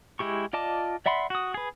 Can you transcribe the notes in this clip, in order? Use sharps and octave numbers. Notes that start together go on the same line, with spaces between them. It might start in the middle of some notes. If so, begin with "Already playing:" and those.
G#3 E4 G4 C#6
F4 D5 D#5 A5 D6
D5 E5 F#5 B5 C6
F#4 D#6
G#4 B4